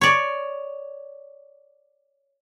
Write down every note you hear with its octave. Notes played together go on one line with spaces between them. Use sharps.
C#5 D5